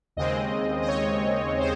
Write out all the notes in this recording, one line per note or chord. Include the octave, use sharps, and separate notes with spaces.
D#2 C#3 G#3 C4 D#5
D#5
C#5
C5